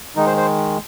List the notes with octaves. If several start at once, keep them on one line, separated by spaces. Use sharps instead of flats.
D#3 G#3 D#4
C5
C5